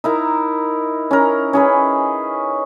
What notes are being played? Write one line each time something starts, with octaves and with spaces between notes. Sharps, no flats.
D#4 E4 A#4
C#4 A#4
C#4 G#4 B4